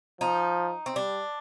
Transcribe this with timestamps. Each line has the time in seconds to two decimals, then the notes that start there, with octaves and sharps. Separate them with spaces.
0.21 F3 D#4
0.86 C4
0.96 G3 D4